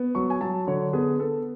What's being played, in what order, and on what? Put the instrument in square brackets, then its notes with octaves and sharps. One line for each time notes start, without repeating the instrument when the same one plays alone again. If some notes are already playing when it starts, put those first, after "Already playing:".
Already playing: [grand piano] B3
F#3 C#6
G#5
F#3 A5
D3 C#5
B3 G#4
B3 A4